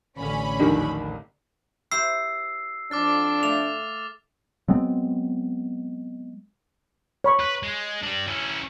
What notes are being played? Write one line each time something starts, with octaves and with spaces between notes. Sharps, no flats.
A1 D3 C#4 B5
A#1 D#2 D4 D#4 G4 A#4
E4 G4 C5 E6 C7
F2 D4 D6 F6 A6
A3 F5 F7
F#3 G#3 B3 C4
C#5 B5 C#6
B4
G#3
D4 G4
C#4 E4